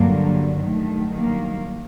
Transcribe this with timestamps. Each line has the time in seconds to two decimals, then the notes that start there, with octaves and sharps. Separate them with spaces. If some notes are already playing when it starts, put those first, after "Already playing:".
Already playing: G2 D3 F#3 A#3
0.62 G2 D#3 F#3 A3
1.17 A#3